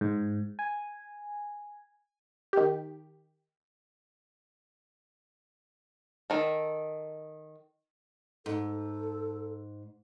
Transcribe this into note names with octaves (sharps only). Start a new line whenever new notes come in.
G#2
G#5
D#3 G4
D#3 A4
G#2 A4